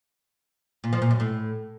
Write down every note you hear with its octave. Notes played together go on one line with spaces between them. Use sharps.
A#2
F3
A#2
F#2
A2